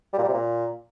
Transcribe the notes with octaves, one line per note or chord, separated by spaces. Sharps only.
G3
A#2
G3
C3
A#2